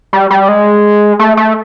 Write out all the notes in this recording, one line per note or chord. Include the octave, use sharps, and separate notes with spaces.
G3
G3
G#3
A3
A3